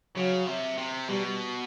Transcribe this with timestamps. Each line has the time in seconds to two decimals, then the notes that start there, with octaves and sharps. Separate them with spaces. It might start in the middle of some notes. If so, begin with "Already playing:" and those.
0.16 C#3 F#3
0.47 C3
0.78 C3
1.09 B2 G3